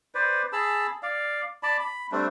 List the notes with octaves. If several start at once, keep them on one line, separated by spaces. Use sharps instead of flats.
B4 C5 D5
G#4 A5 B5 E6
D5 F5
D5 A5 B5
B5
G3 A3 C4 D4